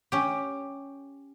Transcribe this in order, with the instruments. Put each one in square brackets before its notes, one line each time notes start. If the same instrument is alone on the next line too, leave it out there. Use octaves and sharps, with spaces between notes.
[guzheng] C#4 G4